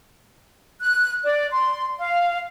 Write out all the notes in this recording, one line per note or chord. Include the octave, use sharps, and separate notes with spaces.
F#6
D5
C6
F5